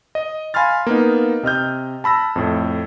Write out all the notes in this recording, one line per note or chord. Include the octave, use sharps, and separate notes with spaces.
D#5
F5 G#5 B5 C6 F6 A6
A#3 B3 D#4
C3 D#5 F6 G6
A5 B5 E6 A#6
F2 A2